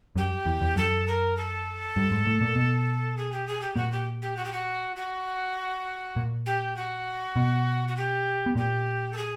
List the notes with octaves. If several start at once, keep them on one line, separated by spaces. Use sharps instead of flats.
F#2 F#3 G4
E2 E3
E2 E3
F#2 F#3 A4
A#4
A4
G2 G3
G#2 G#3
A2 A3
A#2 A#3
B2 B3
G#4
G4
G#4
G4
A#2 A#3 F#4
G4
G4
F#4
G4
F#4
F#4
A#2 A#3
G4
F#4
B2 B3
F#4
G4
B3
A#2 A#3 G4
A4
G#4